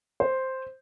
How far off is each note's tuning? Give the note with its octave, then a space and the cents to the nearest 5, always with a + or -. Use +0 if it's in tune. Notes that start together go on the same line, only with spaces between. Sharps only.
C5 +0